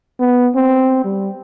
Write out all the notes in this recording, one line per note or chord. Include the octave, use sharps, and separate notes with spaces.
B3
C4
G3